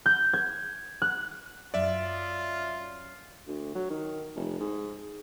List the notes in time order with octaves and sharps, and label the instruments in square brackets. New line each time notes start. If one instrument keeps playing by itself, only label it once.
[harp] G6
G#6
F#6
[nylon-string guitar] F#2 [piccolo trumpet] F4 [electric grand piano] D5 E5
[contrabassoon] D2
F#3
D#3
F1
G#2